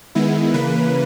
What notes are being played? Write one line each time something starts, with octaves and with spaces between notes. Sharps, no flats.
D#3 G#3 B3 E4
C#3 E3 A#3 B4